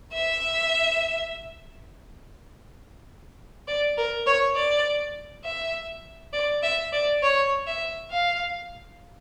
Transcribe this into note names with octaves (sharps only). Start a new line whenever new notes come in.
E5
D5
A#4
C#5
D5
E5
D5
E5
D5
C#5
E5
F5